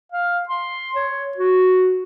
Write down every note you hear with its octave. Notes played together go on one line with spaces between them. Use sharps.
F5
C6
C#5
F#4